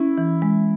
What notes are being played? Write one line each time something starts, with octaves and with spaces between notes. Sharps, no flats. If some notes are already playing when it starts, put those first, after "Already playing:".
Already playing: C#4 E4
E3
G#3